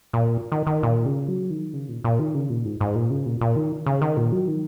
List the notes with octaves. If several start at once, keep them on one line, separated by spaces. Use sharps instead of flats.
A#2
D#3
D#3
A#2
C#3
F#3
D#3
C#3
A#2
A#2
D#3
C#3
A#2
G#2
G#2
A#2
C#3
A#2
A#2
D#3
C#3
D#3
A#2
F#3
D#3